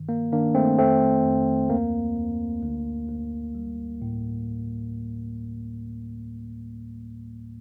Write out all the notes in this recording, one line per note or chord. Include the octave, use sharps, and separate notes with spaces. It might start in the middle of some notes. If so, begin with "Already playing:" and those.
Already playing: G2 D#3
A#3
D#3 A#3 D4
A3 C4
F2 A3 C4
F2
D2 A#3
D2
D2
D2
G3
A2